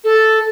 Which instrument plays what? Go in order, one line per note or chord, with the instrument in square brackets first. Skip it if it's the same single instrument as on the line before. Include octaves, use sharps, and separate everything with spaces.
[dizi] A4